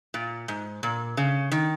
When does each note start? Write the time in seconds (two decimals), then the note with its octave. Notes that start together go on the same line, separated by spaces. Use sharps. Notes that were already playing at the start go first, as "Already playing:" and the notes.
0.14 A#2
0.48 G#2
0.83 A#2
1.17 C#3
1.52 D#3